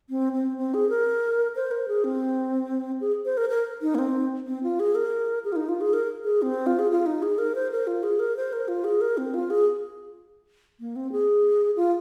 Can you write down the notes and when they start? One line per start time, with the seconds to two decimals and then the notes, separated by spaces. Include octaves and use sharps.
0.10 C4
0.33 C4
0.58 C4
0.74 G#4
0.90 A#4
1.56 C5
1.71 A#4
1.88 G#4
2.04 C4
3.01 G#4
3.25 C5
3.37 A#4
3.50 A#4
3.82 D#4
3.95 A#3
3.98 C4
4.47 C4
4.63 F4
4.80 G#4
4.95 A#4
5.45 G#4
5.52 F4
5.56 D#4
5.69 F4
5.81 G#4
5.93 A#4
6.25 G#4
6.42 C4
6.67 F4
6.79 G#4
6.91 F4
7.06 D#4
7.22 G#4
7.38 A#4
7.55 C5
7.72 A#4
7.87 F4
8.03 G#4
8.19 A#4
8.37 C5
8.53 A#4
8.68 F4
8.84 G#4
9.01 A#4
9.17 C4
9.34 F4
9.50 G#4
10.80 A#3
10.96 C4
11.12 G#4
11.76 F4